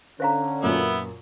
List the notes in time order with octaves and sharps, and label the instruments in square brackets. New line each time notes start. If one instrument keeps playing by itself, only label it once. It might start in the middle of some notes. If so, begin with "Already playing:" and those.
[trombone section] D3 C#4 [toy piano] C5 F5 A#5
[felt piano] F#2 A#2 [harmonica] B3 E4